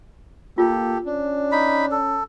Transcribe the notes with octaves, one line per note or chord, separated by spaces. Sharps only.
A#3 F4 G4 A4
C#4 D4
D#4 B5
A4